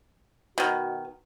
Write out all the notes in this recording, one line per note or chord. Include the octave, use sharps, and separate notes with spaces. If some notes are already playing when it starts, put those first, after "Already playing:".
B2 D#3 F#4